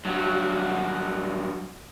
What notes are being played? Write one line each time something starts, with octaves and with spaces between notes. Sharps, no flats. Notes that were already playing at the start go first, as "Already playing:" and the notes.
G2 F#3